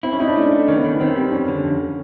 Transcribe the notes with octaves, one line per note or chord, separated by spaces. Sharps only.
C4 E4
C#4
D#4 E4
D4
A3
A3
D#3 C#4
B3
D#3
D#3 C4
G3
F2 C#4
D3
F2